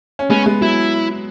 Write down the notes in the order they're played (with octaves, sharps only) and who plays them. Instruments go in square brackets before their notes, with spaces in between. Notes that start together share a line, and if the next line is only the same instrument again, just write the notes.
[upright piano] C#4
[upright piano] G#3 B3 [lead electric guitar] C#4
[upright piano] G#3 B3
[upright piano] F#3 [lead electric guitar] E4